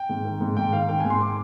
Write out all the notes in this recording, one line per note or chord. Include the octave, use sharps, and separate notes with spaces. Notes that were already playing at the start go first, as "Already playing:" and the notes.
Already playing: G5
G#2
D#3
G#2
G#2 G5
D#3 F5
D#3 G5
G#5
G#2
C6
D6